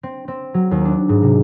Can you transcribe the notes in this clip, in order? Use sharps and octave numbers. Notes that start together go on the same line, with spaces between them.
C4
C4
F#3
D#2
D4
G#2
C3